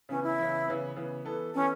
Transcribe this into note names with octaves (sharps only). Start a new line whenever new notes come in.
C#3 E3 B3 C#4
E4
C#3 E3 B3
C#3 E3 B3
C#3 E3 B3
E3 B3 A4
E3 B3 C#4 A4